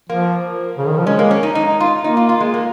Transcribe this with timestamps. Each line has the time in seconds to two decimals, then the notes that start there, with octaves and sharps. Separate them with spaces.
0.09 F3 A#3
0.78 C#3
0.87 D#3
0.97 F3
1.07 G#3 C#4
1.19 A#3
1.31 C#4
1.43 D#4
1.55 D#4
1.80 F4
2.04 A#3 D#4
2.17 F4
2.29 F4
2.41 G#3
2.54 A#3